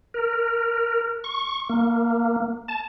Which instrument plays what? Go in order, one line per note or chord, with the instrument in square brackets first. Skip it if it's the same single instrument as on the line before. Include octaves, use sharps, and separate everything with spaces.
[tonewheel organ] A#4
C#6
A#3
A5